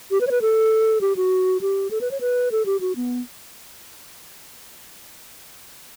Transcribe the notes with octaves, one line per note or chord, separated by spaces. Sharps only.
G4
B4
C#5
B4
A4
G4
F#4
G4
A4
B4
C#5
B4
A4
G4
F#4
B3